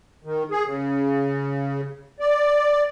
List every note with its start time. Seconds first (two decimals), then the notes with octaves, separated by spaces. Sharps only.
0.24 D#3
0.51 G#4
0.66 C#3
2.20 D5